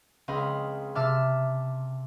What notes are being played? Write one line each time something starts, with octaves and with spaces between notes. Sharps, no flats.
C#2 C4 D#5 F5 G5 B5
C3 E5 A5 D6 E6 F6